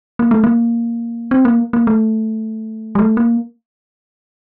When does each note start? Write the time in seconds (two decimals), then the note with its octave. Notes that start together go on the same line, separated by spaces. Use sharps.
0.19 A#3
0.31 A3
0.44 A#3
1.31 C4
1.45 A#3
1.73 A#3
1.87 A3
2.95 G3
2.99 A3
3.17 A#3